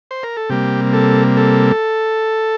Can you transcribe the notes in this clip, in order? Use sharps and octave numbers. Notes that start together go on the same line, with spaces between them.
C5
A#4
A4
C3 G3 A#3 G4
A4
A4